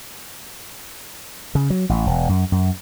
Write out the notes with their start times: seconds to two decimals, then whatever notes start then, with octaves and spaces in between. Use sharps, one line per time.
1.55 C#3
1.70 F#3
1.89 A1
2.07 E1
2.29 F#2
2.52 F#2